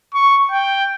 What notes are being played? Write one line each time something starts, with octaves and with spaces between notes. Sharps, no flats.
C#6
G5